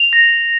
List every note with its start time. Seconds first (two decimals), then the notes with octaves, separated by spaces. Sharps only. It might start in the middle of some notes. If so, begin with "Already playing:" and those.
Already playing: F7
0.13 A#6